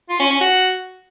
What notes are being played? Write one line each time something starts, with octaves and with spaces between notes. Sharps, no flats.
F4
C#4
C#4
F#4